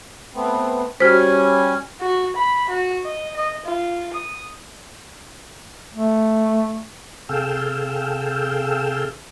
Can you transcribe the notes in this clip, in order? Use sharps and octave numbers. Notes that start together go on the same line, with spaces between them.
A3 B3 C4
G3 C#4 F#4 C5 G#5
F#4
B5
F#4
D#5
D#5
F4
D#6
A3
C3 G#4 A4 F5 G5 E6